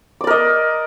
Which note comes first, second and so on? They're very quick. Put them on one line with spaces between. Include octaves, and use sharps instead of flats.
D6 D5 A#4 D#5